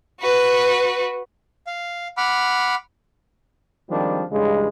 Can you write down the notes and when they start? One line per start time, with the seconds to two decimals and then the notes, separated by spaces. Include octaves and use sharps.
0.21 F#4 B4
1.67 F5
2.17 F#5 B5 D6 F6
3.90 D#3 F3 G3 G#3 C4 D4
4.31 A1 G2 C#3 G#3